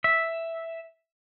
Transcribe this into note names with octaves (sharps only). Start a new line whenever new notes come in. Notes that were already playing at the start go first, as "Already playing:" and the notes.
E5